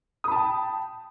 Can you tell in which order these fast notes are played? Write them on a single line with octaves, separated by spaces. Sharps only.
D#6 B5 A5 G5